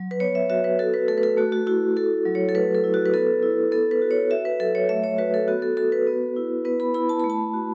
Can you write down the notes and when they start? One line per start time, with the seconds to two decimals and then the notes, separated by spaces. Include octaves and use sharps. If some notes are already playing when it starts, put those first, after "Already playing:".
Already playing: F#3
0.11 B4
0.20 B3 C#5
0.35 E5
0.50 F#4 E5
0.64 B4
0.79 F#4 A4
0.94 B4
1.08 A3 A4
1.18 B4
1.23 A4
1.37 A3 F#4
1.52 F#4
1.67 E4 F#4
1.96 F#4 A4
2.25 F#3
2.35 C#5
2.49 A4
2.55 A3 B4
2.74 A4
2.84 E4
2.94 F#4
3.06 B4
3.13 B3 A4
3.43 E4
3.71 B3 A4
3.91 B4
4.02 F#4
4.11 C#5
4.30 F#4 E5
4.45 B4
4.60 F#3 A4
4.75 C#5
4.89 A3 E5
5.04 C#5
5.18 F#4 B4
5.34 A4
5.48 B3 F#4
5.62 A4
5.77 F#4 A4
5.92 B4
6.07 B3
6.36 E4
6.65 B3 B4
6.80 B5
6.94 E4 B5
7.09 A5
7.20 A3 B5
7.30 A5
7.54 F#4